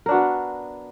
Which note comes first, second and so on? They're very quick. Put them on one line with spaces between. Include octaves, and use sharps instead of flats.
A#4 D4 F#4 B3